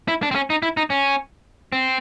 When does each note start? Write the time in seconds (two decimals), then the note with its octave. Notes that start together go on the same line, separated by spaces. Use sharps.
0.08 E4
0.23 D4
0.31 C4
0.35 C#4
0.50 D#4
0.63 E4
0.77 D#4
0.90 C#4
1.72 C4